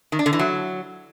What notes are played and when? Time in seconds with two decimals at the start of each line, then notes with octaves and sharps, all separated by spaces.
0.12 D#3
0.19 D4
0.26 D3
0.33 E3
0.39 F#3